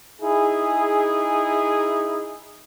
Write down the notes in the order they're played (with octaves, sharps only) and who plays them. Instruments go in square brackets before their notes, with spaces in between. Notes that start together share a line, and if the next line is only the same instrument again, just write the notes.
[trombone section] D#4 E4 G#4